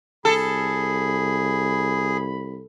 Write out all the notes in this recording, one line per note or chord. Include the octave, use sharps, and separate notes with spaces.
C2 G#4 A4 B5